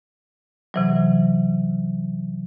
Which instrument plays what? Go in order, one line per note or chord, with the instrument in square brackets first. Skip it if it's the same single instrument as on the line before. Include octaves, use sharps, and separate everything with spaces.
[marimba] C3 E3 F#3